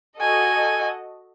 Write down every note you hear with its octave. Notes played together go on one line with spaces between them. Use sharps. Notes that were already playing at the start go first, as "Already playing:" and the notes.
F#4 A4 D#5 G#5